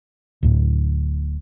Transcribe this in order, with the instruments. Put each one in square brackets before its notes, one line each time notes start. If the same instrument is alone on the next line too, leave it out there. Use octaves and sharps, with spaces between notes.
[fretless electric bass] D1 D2 A2